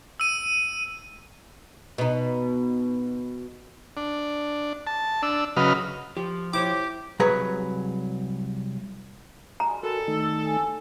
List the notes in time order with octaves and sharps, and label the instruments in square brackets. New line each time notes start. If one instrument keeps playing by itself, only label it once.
[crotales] E6 D#7
[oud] B2 D#4
[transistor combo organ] D4
A5
D4 E6
C#3 F#3 B4 D#5 F6
[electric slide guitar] F3 [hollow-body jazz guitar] G4
[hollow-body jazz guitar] E4 C5 C#5 [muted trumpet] G4 [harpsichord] D6
[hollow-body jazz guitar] C2 F#3 G#4 B4 A#5 B5
[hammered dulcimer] G3 G#3 D6 [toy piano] A#5
[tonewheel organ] F#4 A#4 [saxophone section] A4
[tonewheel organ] D#3 A3 D#4
[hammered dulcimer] G#5